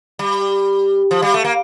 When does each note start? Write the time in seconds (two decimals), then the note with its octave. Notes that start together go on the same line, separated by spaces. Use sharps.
0.19 G3
1.11 F3
1.22 G3
1.34 A3
1.44 A#3